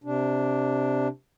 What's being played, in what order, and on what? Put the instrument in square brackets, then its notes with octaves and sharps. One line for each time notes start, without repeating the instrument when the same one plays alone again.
[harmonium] C3 D4